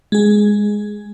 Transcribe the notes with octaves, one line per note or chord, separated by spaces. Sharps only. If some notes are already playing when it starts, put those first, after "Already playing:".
G#3 G#4